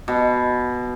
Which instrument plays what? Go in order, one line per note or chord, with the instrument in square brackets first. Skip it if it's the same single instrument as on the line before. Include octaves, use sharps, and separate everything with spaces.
[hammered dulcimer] B2